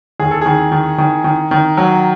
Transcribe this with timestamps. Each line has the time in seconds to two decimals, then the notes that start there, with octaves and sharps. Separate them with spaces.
0.20 D#2 G#4
0.31 A4
0.41 D#3 G#4
0.72 D#3
0.98 D#3
1.24 D#3
1.51 D#3
1.77 F#3